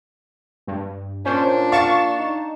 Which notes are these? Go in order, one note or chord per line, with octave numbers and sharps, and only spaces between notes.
G2
A#2 C#4 D4 C5
F5 C#6 A6 E7
D#4